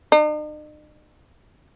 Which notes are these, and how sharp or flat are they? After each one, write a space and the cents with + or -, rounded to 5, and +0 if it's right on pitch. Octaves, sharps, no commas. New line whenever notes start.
D#4 -45